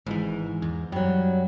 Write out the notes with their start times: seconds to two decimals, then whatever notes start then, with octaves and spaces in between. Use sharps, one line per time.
0.06 G#1 G#2 E3
0.62 E2
0.92 F#2 F#3 G3